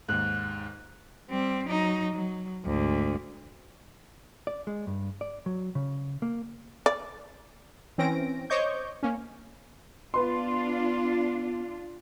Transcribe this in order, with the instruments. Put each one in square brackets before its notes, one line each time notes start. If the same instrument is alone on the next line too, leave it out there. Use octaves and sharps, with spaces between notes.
[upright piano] D#2 G#2 [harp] F#6
[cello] G3 C4
F#3 D#4
F#3
D2 G#2
[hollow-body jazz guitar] D5
G#3
G2
D5
F#3
C#3
A#3
[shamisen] D5
[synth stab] E3 C4 C#4 A#6 D7
C5 C#5 D#5 C#6 D6 G6
A#3 C#4
[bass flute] B3 [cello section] D4 F4 [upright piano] B4 C6